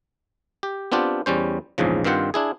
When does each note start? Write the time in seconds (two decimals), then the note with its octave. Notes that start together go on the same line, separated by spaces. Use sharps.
0.63 G4
0.92 B3 C4 D4 F4 G4
1.26 E2 G3 C#4 C5
1.78 A#1 E2 G#2 C#3 F3
2.04 G2 D#3 C4 F4 C5 F#5
2.34 D4 E4 G#4